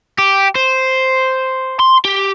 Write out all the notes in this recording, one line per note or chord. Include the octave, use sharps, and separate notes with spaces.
G4
C5
C6
G4